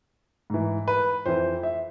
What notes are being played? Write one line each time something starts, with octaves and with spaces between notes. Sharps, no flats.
G#2 E3
B4
F2 E3 C5
E5